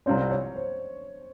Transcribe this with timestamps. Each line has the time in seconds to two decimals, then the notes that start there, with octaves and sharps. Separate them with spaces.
0.06 C2 C3 G3 C4 F4 C#5
0.31 C#5
0.56 C5